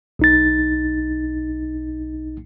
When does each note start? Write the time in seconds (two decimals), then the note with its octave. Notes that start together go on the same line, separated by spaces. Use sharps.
0.19 B1 D#4 A6